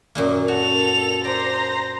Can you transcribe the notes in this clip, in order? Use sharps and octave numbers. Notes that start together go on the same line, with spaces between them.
F#2 A#2 A#3
F#4 A4 F7
C5 D5 A#5